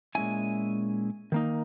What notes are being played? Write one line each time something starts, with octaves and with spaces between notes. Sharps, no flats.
A#2 G#3 C#4 E4 G#5
D#3 A#3 D#4